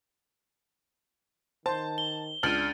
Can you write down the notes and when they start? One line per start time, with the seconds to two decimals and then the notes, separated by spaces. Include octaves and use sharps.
1.66 D#3 C5 A5
1.98 G7
2.43 C#2 D4 A5 F6 A6 D7 D#7 F#7